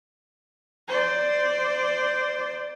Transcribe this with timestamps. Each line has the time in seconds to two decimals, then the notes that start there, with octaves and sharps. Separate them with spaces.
0.88 C5 D5